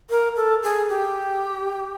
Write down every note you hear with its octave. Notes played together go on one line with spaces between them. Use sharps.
A#4
A4
G#4
G4